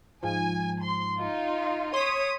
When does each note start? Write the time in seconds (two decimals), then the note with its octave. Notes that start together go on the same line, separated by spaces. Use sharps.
0.23 G#2 F3 G#5
0.80 C6
1.18 D#4 F4
1.94 C#5 C6 D#6 B6